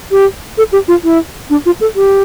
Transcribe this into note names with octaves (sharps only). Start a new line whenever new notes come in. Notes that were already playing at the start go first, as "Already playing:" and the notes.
G4
A4
G4
F4
E4
D4
F4
A4
G4